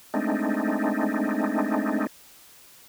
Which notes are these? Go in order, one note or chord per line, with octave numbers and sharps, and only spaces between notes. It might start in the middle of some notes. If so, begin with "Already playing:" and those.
G#3 A3 C4 D4 D#4